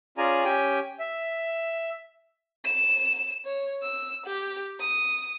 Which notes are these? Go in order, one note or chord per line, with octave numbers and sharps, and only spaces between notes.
C#4 F4 G#4 D5 G#5 A#5
C#4 G4 G5 G#5
E5
E7
C#5
E6
G4
D#6